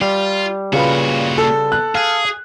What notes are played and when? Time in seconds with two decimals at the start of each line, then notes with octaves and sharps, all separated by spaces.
0.01 G3 F4
0.73 A#2 C#3 F4 F#4 B4
1.38 A4
1.72 F#6
1.95 G#4 F5